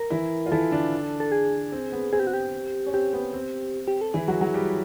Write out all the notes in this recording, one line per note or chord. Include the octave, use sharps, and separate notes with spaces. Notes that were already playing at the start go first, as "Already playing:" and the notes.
Already playing: A#4
E3 E4
F4
E3 E4 A4
D3 D4
A4
G#4
C4
B3
C4 G#4
G4
F#4
G4
C#4
C4 G4
B3
C4
G4
A4
E3 E4 G#4
F#3 F#4
F#3 F#4
G3 G4